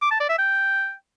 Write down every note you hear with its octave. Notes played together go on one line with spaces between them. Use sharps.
D6
A5
D5
E5
G5